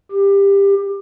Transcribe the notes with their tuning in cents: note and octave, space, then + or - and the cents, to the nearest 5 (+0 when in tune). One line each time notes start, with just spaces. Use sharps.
G4 +20